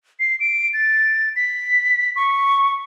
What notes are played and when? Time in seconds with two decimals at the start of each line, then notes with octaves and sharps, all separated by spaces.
0.20 C7
0.40 D7
0.74 A6
1.36 B6
2.16 C#6